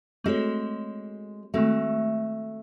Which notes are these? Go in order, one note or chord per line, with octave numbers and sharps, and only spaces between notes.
G#3 A3 C4 F#4 A4 C#5
D#3 G#3 A3 C4 F#4